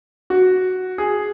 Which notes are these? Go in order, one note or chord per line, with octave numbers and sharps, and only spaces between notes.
F#4
G#4